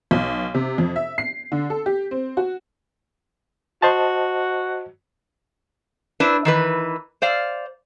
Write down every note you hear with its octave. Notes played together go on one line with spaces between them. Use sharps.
B1
C3
F2
E5
C7
D3
A4
G4
C4
F#4
F#4 C5 D#5 A5
D4 E4 B4 C5
D#3 E3 B4
C5 D5 F5